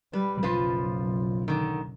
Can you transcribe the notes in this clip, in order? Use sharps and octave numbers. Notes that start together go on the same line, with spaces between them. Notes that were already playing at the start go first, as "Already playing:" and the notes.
G3 B4
F#1 B1 F3 F4 B4
D3 D#3